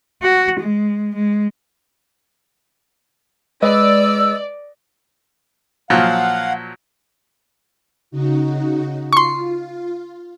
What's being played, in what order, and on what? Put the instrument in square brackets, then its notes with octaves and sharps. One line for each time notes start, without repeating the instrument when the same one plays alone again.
[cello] F#4
G#3
G#3
[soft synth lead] G#3 [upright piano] B4 D#5 [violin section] D5 [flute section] E6
[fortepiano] A#2 F3 F#3 [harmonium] F5 F#5
[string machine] C#3 D#4 F#4
[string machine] F4 [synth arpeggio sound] C6 C#6